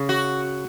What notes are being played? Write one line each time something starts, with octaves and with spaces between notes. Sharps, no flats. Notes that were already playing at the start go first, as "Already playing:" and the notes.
Already playing: C#3
F#4